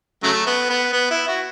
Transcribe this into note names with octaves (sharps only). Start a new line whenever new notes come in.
C#3 F#3 A3
B3
B3
B3
E4
F#4